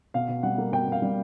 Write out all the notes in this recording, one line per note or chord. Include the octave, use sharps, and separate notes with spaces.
B2 F5
B2
G3 F#5
A#3
B2 G5
B2 F5
G3